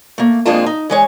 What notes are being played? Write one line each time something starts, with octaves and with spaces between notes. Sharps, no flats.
A3 A#3
F2 G#3 A#3 D4 F4 A5
D#4
E3 G#3 C#5